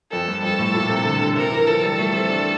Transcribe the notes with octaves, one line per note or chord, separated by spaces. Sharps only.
F2 A4
G2
F2 A4
A2
A#2
C3
D3
D3
C3 A#4
E3
F3 A4
G3
A3
C4
D4